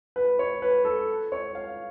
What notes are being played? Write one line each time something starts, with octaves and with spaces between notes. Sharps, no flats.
B4
C#5
B4
A4
C#5
F5